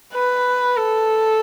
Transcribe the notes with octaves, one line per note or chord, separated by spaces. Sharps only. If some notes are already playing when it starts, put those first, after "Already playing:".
B4
A4